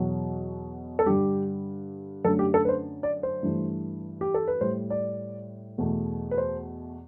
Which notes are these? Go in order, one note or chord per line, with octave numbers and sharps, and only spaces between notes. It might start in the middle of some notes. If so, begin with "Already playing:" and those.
Already playing: E2 B2 F#3
A4
G2 D3 G3 G4
F#2 D3 A3 A4
G4
A4
B4
C5
D5
C5
G2 E3 A3
G4
A4
B4
A2 G3 C5
D5
E2 B2 A3
B4
C5